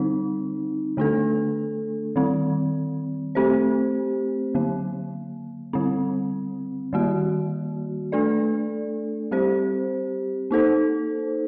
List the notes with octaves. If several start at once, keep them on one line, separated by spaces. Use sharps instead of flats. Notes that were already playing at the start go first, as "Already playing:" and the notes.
Already playing: D3 G3 C4 D#4
D3 A3 D4 A4
D#3 G3 C4
A3 C4 G4 C5
D3 F#3 A#3
D3 G3 C4
D#3 G3 A#3 F#4
A3 D4 A4 D5
G3 C4 G4 C5
A#3 D#4 A4 C5